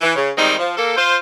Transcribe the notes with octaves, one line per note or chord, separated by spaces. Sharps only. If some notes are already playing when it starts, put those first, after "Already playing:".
E3
C#3
D#3 G3 G#3 C4 D#4
F3
A#3 A4
F4 C5